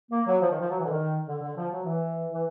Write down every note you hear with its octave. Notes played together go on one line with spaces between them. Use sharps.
A#3
F#3
F3
D#3
F3
F#3
E3
D3
D#3
D3
D3
F3
F#3
E3
E3